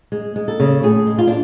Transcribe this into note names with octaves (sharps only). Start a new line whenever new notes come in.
G#3
G#3
A4
C#3
A2 G#4
G#3
F4
D4